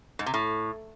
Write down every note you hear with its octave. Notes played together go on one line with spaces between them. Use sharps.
G#2
C3
A2